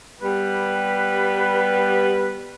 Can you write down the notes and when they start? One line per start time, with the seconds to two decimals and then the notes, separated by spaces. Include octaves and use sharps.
0.21 G3 B3 B4